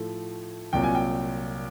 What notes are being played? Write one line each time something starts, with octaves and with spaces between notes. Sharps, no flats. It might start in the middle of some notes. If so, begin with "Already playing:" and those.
Already playing: A2 F3 A3
C2 A#2 F#3 G5
G#5
G5